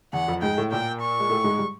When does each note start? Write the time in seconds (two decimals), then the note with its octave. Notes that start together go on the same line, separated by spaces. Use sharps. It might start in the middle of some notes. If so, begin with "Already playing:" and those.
0.13 E2 E3 F#5
0.28 F2 F3
0.42 G#2 G#3 G5
0.58 A2 A3
0.71 A#2 A#3 G5
1.01 C#6
1.20 G#3
1.30 A2 A3
1.44 G#2 G#3
1.58 G3